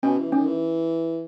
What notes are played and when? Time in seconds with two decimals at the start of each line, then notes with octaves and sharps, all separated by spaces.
0.03 B2 C#4
0.18 E3
0.32 D#3 C#4
0.47 E3